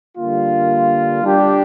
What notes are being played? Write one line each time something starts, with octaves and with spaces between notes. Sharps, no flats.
D3 G3 A#3 F4
G3 D4 G4